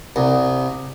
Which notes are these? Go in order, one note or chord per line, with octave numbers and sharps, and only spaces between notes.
C2